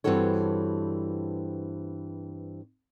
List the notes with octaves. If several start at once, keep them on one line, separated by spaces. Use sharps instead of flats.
G2 E3 C4 F#4 A4 C#5